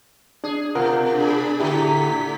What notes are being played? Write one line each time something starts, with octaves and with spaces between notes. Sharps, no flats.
D4 G#4
B2 F4 A#4 F#5
D4 G#4 B5
A2 D3 E4 G4 B6